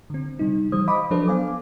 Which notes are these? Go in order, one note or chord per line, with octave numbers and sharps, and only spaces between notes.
D3 C4
C3 G3 D#4
E3 G3 C5 D#6
D#5 F5 B5 D6 D#6
F3 F#3 D4 A4 B4 C5
B3 F5 G#5 D6